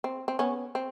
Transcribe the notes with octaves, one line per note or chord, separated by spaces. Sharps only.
C4
C4
B3 C#4
C4